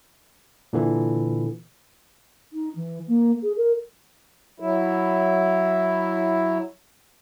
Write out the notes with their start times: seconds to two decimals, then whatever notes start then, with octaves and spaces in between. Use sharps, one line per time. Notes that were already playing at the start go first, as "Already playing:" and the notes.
0.73 A#2 D3 E3
2.52 D#4
2.75 E3
3.07 A#3
3.42 G#4
3.57 A#4
4.60 F#3 E4